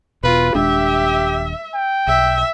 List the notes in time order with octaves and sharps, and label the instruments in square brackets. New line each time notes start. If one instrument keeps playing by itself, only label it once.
[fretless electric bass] E1 B2 [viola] F4 [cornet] B4
[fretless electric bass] D#1 G#3 D4 [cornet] G4 [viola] E5
[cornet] G5
[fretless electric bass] B1 [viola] E5